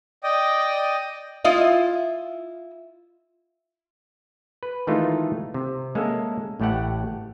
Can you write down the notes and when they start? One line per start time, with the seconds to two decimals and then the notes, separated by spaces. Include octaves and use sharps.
0.23 D5 D#5 G5 D#6
1.45 E4 F4 D#5
4.63 B4
4.87 D#3 E3 G#3 A3 D#4 F4
5.54 C3
5.95 G#3 A#3 C#4 A4 E5
6.60 A1 A2 A3 G4 F#5